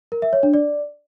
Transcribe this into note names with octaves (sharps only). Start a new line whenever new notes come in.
A#4
E5
C#5
D4
D5